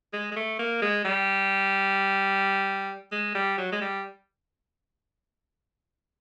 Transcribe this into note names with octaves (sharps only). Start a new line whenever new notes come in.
G#3
G#3
A3
A#3
G#3
G3
G#3
G3
F#3
G#3
G3